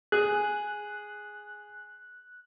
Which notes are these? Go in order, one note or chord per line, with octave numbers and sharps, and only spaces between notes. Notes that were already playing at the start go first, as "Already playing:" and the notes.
G#4 F#6